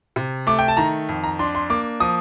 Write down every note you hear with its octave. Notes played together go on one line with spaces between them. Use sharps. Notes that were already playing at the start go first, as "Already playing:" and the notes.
C3
A3 D6
G5
A5
D#3 A#5
F2
A#5
D4 C6
C6
A#3 D6
F3 D#6